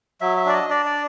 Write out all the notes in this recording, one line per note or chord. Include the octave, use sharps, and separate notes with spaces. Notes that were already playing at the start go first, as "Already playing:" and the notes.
F#3 E5
E5
D4 D5
D#5
D4 D5
D5